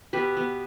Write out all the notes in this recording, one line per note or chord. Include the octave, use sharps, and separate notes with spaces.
B2 G4 B4
B3